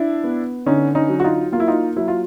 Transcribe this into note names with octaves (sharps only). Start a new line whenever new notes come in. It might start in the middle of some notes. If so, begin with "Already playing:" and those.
Already playing: D4 E4
B3
D3 C#4 D#4
C#4 D#4
F#3
F#4
D#4 F4
A#3 F4
E4
D#4 F4
F#3 E4
F4